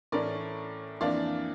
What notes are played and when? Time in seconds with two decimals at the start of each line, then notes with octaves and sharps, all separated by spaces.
0.12 A2 E3 A3 C#4 A#4 D5
1.01 F2 E3 A#3 D4 D5 F5